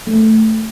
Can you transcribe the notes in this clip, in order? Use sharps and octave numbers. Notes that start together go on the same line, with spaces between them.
A3